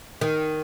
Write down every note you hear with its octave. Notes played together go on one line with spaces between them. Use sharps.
D#3